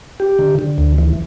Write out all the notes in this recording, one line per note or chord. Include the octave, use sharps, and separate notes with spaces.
G4
D3
D3
D2
E3